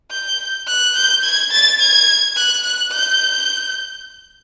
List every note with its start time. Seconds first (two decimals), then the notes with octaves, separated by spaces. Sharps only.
0.11 G6
0.67 F#6
0.95 G6
1.24 G#6
1.51 A6
1.80 G#6
2.36 F#6
2.64 F#6
2.92 G6